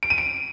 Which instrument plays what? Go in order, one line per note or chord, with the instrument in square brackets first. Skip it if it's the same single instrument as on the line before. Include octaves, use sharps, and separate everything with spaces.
[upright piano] D7
D#7
D7